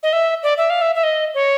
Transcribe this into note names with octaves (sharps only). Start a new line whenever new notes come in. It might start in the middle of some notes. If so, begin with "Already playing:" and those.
D#5
E5
D5
E5
F5
E5
E5
D#5
C#5